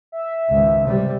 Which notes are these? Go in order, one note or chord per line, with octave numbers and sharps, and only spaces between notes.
E5
G#1 C#2
C3 G3